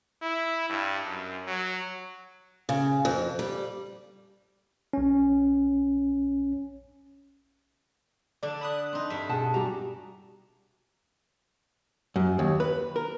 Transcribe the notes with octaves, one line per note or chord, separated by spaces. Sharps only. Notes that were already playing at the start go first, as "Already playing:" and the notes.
E4
G2
F#2
F#3
C#3
F2
G3
A#1 C#4
D3 D4 D5
B5 D#6 F#6
C4 D#4
G2 E5
B2 G#4 F#5 A5
G3 F#4 G4 A#5
F#2
D#2
B4
A#4